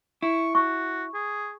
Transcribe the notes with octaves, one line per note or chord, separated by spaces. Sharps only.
E4 C#6
F#4 C#6
G#4